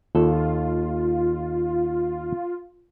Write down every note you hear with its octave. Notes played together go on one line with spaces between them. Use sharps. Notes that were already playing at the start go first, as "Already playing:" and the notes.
D#2 F4 A4